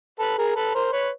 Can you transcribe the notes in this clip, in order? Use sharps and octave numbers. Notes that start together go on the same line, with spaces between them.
A4 B4
G#4 A#4
A4 B4
A#4 C5
B4 C#5